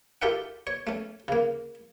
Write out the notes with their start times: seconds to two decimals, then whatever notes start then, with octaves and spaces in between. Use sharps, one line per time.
0.22 F4 G4 A4 A#4 E5 F#5
0.67 C#5
0.87 A3 C#4
1.28 C#3 A#3